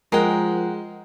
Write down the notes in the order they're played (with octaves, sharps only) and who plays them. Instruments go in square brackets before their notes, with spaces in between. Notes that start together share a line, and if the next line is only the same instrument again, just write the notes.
[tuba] F3 [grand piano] G#3 [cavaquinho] A#4 F#5 G5